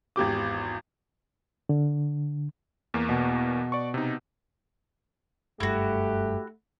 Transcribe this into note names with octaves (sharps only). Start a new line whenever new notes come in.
G#1 E2 G4 D6
D3
E2 A#3
B2
D5 C#6
C3 D#4
F#1 G2 A3 E4 F#4 G4